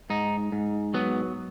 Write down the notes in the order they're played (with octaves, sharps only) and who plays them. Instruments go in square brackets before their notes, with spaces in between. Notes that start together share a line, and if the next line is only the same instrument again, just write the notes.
[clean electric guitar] G#2 D#4
G#2
F#3 B3